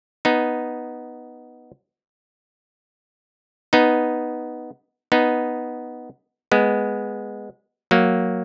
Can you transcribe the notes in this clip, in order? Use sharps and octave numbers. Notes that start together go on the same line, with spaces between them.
B3 D#4
B3 D#4
B3 D#4
G#3 B3
F#3 A#3